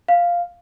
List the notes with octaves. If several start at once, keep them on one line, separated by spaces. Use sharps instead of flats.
F5